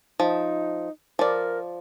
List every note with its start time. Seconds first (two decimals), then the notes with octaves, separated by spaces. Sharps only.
0.20 F3 D#4
1.19 F3 A#4 D5